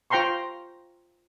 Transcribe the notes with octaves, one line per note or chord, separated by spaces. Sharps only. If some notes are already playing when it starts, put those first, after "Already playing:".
F4 C5 G5 A#5 C6 C#6